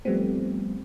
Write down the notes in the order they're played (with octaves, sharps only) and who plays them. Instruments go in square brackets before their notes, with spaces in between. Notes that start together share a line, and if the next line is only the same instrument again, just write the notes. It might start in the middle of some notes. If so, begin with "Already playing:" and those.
[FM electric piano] F3 G3 A3 B3 C4